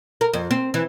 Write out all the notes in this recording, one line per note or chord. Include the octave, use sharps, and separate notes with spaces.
A#4
F2
C4
E3